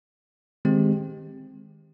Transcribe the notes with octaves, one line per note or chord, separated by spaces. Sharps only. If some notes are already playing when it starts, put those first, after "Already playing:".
D#3 G#3 C4 G4